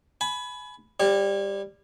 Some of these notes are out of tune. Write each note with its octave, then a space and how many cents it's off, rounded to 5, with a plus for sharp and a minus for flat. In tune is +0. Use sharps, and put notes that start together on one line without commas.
G#5 +35 B5 +0
G3 +15 C#5 -30